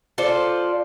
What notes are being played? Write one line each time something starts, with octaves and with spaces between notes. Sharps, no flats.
F4 A4 C5 D5